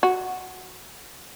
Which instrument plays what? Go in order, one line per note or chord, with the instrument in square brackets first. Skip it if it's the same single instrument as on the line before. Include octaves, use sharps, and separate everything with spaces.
[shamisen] F#4